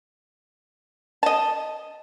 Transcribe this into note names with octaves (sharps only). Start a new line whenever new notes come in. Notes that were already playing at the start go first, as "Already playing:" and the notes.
D#5 A5